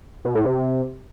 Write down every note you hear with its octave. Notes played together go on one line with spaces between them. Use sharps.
B2
A2
C3